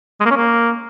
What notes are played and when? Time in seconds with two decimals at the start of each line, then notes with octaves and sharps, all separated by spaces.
0.20 G#3
0.26 A#3
0.31 C#4
0.36 A#3